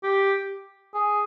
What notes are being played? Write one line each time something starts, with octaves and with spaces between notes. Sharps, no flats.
G4
G#4